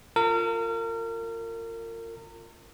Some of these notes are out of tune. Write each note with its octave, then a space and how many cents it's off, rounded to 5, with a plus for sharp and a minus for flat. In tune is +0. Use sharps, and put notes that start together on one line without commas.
F4 +0 A#4 -35